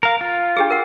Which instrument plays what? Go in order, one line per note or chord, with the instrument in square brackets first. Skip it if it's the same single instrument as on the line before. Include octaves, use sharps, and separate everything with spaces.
[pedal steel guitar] A#4 F5
F4
[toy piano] D4 G4 G#4
A#4 F#5